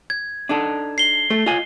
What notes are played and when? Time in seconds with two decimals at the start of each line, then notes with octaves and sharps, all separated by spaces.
0.10 G#6
0.49 D4 D#4 A4
0.98 C7 G7
1.30 A3 A4
1.46 F4 D#5 G#5